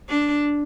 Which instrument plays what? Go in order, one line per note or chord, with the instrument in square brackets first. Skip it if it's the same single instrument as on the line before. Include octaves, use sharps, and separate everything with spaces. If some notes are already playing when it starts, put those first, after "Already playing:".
[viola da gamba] D4